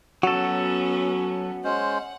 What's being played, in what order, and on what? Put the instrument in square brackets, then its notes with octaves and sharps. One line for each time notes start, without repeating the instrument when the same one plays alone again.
[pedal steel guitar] F#3 A4 [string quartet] B3 C#4 [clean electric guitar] F#4
[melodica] G#3 C#4 C5 [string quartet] F#5